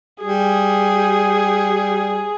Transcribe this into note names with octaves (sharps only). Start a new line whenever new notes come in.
G3 G#4